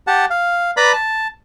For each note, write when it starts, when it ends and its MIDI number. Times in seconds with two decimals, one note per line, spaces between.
0.07 0.25 67
0.07 0.25 78
0.07 0.25 81
0.30 0.71 77
0.77 0.93 71
0.77 0.93 74
0.77 0.93 82
0.77 0.93 83
0.93 1.27 81